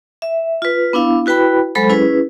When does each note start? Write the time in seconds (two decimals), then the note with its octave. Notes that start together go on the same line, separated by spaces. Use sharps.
0.22 E5
0.62 F4 B4
0.93 B3 D4 E4 F5
1.26 E4 F#4 B4 G5 B5
1.75 F#3 G#3 A4 C5 B5
1.89 C#4 E4 G#4 B4